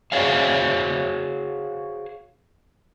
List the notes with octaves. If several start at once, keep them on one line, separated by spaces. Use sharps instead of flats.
F#4 G#4 C5 C#5 F5